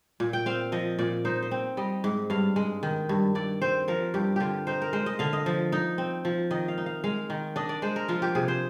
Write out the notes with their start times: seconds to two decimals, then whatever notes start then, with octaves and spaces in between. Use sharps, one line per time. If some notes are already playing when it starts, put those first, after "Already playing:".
0.20 A#2
0.33 G5
0.46 C4 F5
0.72 F3 D#5
0.99 A#2 D5
1.25 D#4 C5
1.42 C5
1.51 C4
1.77 G3 D#5
2.04 G#2
2.30 G2 F5
2.56 G#3
2.83 D#3
3.09 G2
3.35 G2 D5
3.62 C4 C5
3.88 F3 A#4
4.14 G2 G4
4.36 D3 F4 G4
4.67 D#4 C5
4.82 A#4
4.93 G#3 C5
5.06 D#5
5.19 D3 F5
5.33 D#5
5.46 F3
5.72 D#4
5.98 C4
6.25 F3
6.51 D#3 D#5
6.68 F5
6.78 D#4
6.86 F5
7.04 G#3 F5
7.30 D#3
7.56 D4 D#5
7.69 D5
7.82 G#3 C5
7.96 A#4
8.08 F3 F4
8.22 G4
8.35 C3 G#4
8.48 C5